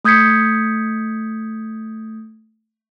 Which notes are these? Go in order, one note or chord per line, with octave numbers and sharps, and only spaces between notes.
A3 D#6 G6 G#6 B6 C#7